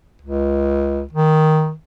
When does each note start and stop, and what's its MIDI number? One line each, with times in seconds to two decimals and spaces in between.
0.22 1.04 37
1.13 1.72 51